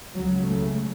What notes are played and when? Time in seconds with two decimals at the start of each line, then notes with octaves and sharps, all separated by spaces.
0.15 C#2 C#3 F#3
0.44 A3